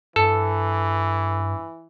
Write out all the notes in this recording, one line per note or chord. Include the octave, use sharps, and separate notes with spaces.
G2 E3 A4